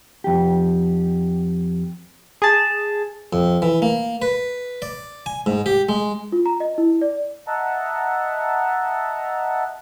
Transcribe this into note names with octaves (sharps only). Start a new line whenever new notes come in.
F2 G4
G#4 A5
F2
E3
A#3
B4
D5
G#5
G#2
G4
G#3
F4
A#5
D#5
E4
D5
D#5 E5 F#5 A5 A#5